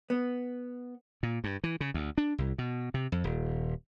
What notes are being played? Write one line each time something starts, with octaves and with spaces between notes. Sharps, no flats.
B3
A#2
G2
E3
C#3
D2
D4
C2
B2
C3
F2
D#1